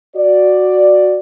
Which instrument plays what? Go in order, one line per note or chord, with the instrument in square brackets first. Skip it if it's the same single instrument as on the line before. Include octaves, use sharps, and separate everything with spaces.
[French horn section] F#4 D5